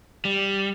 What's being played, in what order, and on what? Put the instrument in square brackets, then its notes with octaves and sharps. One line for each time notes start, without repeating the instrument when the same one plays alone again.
[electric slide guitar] G3